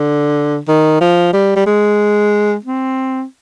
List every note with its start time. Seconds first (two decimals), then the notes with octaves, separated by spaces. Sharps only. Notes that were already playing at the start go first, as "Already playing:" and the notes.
Already playing: D3
0.68 D#3
1.01 F3
1.34 G3
1.56 G3
1.67 G#3
2.65 C4